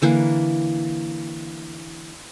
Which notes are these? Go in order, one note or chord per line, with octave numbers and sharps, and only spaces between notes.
D3 E3 A#3